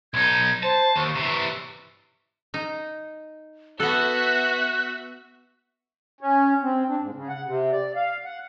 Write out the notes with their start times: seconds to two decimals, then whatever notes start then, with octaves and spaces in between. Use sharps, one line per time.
0.14 B1 D#4 G#6
0.63 C5 A5
0.96 D#2 C#6
1.15 C3 E3
2.54 D#4
3.80 B3 F#4 A4 E5 F#6
6.21 C#4
6.63 C4
6.88 D4
7.01 G#2
7.14 C#3
7.29 F#5
7.46 C3
7.72 D5
7.96 F5
8.25 F#5